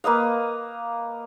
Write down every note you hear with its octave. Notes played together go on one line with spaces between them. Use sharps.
A#3 B4 D#5 F5